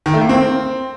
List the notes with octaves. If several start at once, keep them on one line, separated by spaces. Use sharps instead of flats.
D#3
A3
A#3
C4